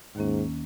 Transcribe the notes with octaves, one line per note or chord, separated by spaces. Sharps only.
D#2 G#2 D#3 A#3 C#4